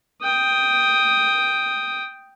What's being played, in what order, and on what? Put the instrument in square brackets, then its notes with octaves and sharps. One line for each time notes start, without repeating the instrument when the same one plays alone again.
[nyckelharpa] G5 D#6